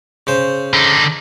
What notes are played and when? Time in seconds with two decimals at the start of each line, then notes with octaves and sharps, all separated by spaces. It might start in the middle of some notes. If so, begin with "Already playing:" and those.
0.27 C#3 C5
0.74 D3 D#4